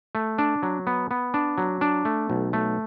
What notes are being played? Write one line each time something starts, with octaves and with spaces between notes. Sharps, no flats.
A3
D4
F#3
B3
B3
D4
F#3
D4
A3
B1
A3